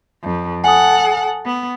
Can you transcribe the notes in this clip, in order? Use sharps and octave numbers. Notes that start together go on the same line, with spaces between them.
F2
A4 F#5 G#5 D#6
B3